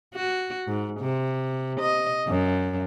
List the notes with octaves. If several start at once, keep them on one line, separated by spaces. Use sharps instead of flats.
F#4
G#2
C3
D#5
F#2